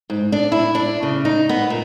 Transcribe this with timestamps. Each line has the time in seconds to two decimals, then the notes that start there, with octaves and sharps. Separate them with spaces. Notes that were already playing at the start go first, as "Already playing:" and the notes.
0.10 G#2
0.32 D4
0.52 E4
0.75 D4
1.03 C#3
1.25 D#4
1.49 B3
1.70 A#2